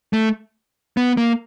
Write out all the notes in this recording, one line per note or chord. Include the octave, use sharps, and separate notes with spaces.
A3
B3
A#3